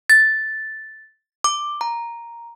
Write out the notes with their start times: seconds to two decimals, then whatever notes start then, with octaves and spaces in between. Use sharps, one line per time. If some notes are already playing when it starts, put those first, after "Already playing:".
0.10 A6
1.44 D6
1.81 A#5